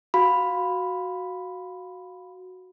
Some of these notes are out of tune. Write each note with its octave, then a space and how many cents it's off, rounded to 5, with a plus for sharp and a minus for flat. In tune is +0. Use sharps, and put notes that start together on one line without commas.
F#4 +0 F5 +15 B5 +0